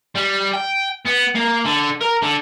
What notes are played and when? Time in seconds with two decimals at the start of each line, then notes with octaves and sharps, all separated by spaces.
0.15 G3
0.53 G5
1.05 B3
1.35 A#3
1.65 D3
2.01 A#4
2.22 D3